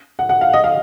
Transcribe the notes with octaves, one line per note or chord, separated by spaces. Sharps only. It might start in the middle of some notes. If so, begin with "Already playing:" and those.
F#5
F#5
F5
D#5
F5